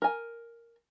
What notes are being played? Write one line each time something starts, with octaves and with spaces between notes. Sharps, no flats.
A#4 G#5